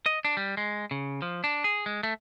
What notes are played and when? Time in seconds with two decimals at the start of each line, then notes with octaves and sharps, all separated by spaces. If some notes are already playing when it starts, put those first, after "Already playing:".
0.06 D#5
0.25 D4
0.37 G3
0.57 G#3
0.91 C#3
1.22 F3
1.44 D4
1.64 G#4
1.86 G#3
2.03 A3